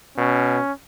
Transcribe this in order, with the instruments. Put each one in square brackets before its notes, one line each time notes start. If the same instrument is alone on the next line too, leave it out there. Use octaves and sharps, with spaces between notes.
[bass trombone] B2 [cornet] C#4